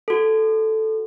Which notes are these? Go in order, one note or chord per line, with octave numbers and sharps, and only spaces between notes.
F#4 A4